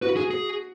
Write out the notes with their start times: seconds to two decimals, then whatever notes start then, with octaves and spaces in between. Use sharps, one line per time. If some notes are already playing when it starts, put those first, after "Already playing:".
0.02 F#4 B4
0.17 G#4
0.31 G#4